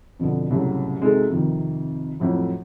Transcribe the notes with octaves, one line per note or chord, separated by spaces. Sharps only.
F2 B2 D3 B3
C2 A2 C#3 F#3
C3 G#3 D#4 F#4 A4
F2 C3 D#3
F2 A2 F#3